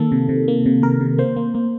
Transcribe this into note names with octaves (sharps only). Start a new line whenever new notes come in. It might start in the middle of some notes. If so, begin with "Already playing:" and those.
Already playing: D#3 A#3 A4
C3
C3
A#3
C3
C3 A#4
C3
A#3 C5
A#3
A#3